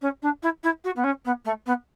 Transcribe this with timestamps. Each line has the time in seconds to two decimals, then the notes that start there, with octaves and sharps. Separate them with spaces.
0.01 C#4
0.22 D4
0.42 E4
0.63 E4
0.84 F#4
0.96 B3
1.03 C#4
1.25 B3
1.45 A3
1.66 B3